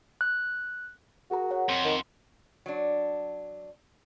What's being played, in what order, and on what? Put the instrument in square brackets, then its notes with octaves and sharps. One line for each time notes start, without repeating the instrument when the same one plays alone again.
[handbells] F#6
[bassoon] F#4 [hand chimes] G#4 A#4 A#5
[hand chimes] C#5 F#5
[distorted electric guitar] F2 [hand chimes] C6
[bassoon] D#3
[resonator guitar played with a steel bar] F#3 D4